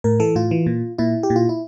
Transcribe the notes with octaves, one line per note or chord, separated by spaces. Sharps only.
A2 A#4
E3 A4
A2 F4
E3
A#2
A#2 E4
G4
A#2
F4
E4